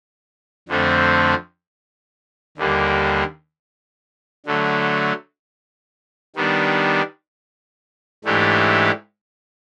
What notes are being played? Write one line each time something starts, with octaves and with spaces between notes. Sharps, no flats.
F2 D3 F3 A3 C4
D#2 D3 G3 A#3
D3 F#3 A3
D#3 G3 B3 D4
G#2 E3 A3 D4 G4